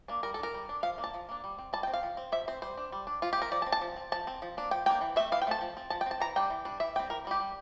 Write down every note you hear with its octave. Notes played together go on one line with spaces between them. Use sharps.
A#3 D4
G3 A#4
A4
D4 A#4
G3
D4
F3 F5
A#3 D4
A5
F3
A#3 D4
G3
C4
G3 A5
G5
C4
F5
F3
C4
F3 E5
C4 C5
G3 C5
D4
G3
D4
F3 F4
G4
C4 A#4
F3 D5
A5
C4
A5
F3
C4
F3 A5
C4
F3
A#3 D4
F3 G5
A#3 D4 G5
E3
A3 C4 E5
E3 F5
G5
A3 C4 A5
F3
C4
F3 A5
G5
C4 A5
E3 A#5
G3 D4 G5
E3
G3 D4
E3 E5
G3 C4 G5
E3 A#4
G3 C4
G4
G3